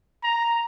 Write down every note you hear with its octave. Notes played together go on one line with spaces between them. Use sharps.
A#5